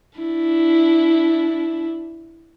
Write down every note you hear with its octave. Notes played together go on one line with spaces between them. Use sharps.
D4 E4